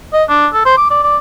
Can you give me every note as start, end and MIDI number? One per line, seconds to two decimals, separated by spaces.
0.13 0.24 75
0.29 0.47 62
0.53 0.65 69
0.65 0.76 72
0.77 0.90 86
0.91 1.01 74
1.03 1.18 74